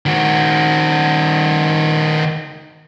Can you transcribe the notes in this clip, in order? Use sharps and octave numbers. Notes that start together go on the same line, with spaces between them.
D#3 F#4